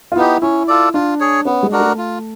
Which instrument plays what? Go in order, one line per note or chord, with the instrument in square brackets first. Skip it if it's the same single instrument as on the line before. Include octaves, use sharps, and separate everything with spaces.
[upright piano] F4
[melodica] B3 D#4 G4 [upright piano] E4
[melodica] C#4 [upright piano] E4
[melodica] F4 A4 D5
[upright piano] D4 [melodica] F4
[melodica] G#4 C#5
[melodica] B3 [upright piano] C#4
[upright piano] G#3
[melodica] D4 F#4 A#4
[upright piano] A3
[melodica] F4